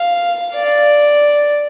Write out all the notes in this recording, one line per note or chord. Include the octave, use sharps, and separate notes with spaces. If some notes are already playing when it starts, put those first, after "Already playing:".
Already playing: F5
D5